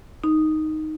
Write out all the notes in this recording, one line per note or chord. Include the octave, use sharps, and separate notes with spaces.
D#4